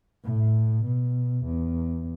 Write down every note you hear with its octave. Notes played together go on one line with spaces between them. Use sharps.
A2
B2
E2